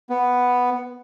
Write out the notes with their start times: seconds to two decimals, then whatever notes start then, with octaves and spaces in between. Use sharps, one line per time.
0.10 B3